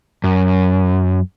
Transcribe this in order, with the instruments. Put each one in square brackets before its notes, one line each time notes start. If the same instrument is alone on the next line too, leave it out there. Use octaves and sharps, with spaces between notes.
[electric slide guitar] F#2